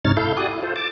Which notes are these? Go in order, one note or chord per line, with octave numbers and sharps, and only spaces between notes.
G#2 C3 D#4 C#5 F6 A6
E4 A4 F5 G6
F#4 G4 D5 G#5 D#6 F#6
E4
F4 A4 C5
A5 D6